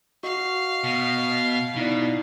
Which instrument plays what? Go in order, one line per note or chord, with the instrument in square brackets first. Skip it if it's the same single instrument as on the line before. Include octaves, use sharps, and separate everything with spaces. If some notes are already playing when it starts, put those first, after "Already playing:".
[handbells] F#4 D#5 [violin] F5
[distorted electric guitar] B2
[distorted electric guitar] B2 [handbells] D#4 E4 D5